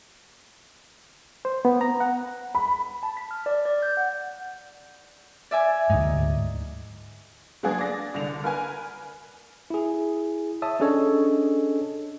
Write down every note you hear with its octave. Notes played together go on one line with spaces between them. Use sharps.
C5
B3
A#5
F#5
B5
A5
B6
F6
D5
D5
G6
F#5
D5 E5 G#5
D2 G#2 D#4
F#3 G#3 A#3 B3 D4 G#4
D5 A#6
C2 D3 D5 F7
A#4 B4 G#5
E4 G#4
C#5 E5 A5 D#6
C#4 D4 G#4 A4 C#5 D#5